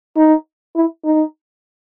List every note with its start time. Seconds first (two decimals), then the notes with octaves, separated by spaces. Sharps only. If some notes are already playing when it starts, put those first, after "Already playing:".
0.16 D#4
0.76 E4
1.05 D#4